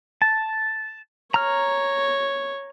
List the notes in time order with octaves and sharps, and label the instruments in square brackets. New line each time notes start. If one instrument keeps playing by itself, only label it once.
[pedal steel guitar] A5
[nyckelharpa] C#5 [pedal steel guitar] A#5 F6